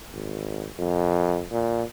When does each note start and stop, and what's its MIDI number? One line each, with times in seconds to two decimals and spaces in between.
0.13 0.66 32
0.79 1.43 41
1.51 1.83 46